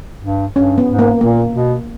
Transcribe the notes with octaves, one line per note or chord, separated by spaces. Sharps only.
G2
G2 C#4
B3
G#2
A#3
A#2 A#3
B2